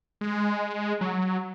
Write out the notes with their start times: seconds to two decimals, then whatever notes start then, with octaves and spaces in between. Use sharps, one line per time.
0.21 G#3
1.01 F#3